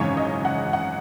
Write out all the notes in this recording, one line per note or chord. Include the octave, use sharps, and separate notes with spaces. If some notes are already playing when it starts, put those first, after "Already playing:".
Already playing: G#1 F#2 C#3 E3 G#3 C#5
D#5
F#5
F#5